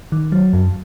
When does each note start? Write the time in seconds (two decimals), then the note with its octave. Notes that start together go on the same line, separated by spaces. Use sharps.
0.12 D#3
0.32 F#3
0.53 F#2